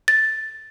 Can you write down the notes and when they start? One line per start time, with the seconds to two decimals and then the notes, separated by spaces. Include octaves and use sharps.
0.08 A6